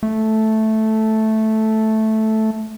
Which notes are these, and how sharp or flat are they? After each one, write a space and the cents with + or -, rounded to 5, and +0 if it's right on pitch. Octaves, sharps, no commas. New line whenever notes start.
A3 -5